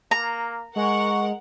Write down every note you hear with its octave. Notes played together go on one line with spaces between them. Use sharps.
A#3 A#5
G#3 A#4 F#5 C#6